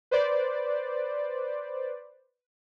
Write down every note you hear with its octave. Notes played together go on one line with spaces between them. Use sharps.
B4 C5 D5